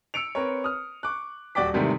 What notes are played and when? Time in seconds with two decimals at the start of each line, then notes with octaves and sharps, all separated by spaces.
0.14 E6 C#7 D7 F7
0.35 C4 A#4 B4 C#5
0.64 D#6 F6
1.03 C#6 D6 F#6
1.55 D#1 F#4 D5 G5 D6 B6
1.74 G#2 C3 D#3 E3 G3 A3